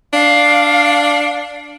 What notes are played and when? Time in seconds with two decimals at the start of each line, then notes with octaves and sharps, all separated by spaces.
0.13 D4 F5